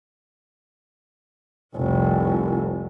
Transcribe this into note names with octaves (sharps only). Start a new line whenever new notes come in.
F1 C2